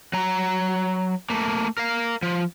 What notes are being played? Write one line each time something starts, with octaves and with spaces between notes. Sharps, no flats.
F#3 A#5
A3 A#3
A#4 F5
F3